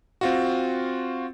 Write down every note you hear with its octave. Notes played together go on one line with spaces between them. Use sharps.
C4 F4 F#4